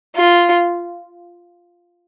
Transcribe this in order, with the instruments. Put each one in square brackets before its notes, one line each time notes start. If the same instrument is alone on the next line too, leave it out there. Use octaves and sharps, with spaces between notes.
[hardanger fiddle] F4